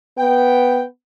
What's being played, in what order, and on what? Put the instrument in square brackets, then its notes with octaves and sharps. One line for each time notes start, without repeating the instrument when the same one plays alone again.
[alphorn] B3 [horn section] G5